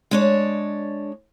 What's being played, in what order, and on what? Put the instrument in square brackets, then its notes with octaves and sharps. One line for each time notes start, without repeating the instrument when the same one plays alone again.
[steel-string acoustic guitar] G#3 D4 C#5